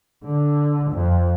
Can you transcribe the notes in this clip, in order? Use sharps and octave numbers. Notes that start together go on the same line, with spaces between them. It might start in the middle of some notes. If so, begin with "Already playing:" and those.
D3
F2